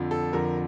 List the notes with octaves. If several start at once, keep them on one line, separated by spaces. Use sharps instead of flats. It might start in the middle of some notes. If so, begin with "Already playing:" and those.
Already playing: F2 D3 F3
A4
F2 D3 F3 A#4